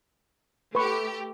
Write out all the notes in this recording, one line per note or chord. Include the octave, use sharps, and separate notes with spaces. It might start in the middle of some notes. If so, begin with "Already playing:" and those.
A3 G4 B4 C#6